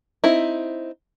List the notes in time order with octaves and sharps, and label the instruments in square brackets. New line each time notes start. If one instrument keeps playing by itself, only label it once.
[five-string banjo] C4 D#4 E4